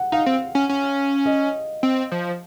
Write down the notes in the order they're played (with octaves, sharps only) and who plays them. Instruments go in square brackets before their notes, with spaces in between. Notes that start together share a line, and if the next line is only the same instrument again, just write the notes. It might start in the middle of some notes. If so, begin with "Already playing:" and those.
Already playing: [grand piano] F#5
[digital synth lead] D#4 [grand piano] F5
[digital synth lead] C4
C#4
C#4
[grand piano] D#5
[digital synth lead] C4
F3